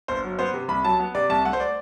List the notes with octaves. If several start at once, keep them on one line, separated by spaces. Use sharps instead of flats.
G1 C5
F#3
B3 C5
C3
C2 B5
F#3 A5
B3
C3 D5
C2 A5
A3 F#5
C5
D5